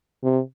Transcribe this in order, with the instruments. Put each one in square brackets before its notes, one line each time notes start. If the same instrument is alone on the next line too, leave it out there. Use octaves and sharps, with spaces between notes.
[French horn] C3